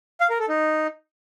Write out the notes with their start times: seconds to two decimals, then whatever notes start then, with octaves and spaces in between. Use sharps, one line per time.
0.21 F5
0.30 A#4
0.39 A4
0.49 D#4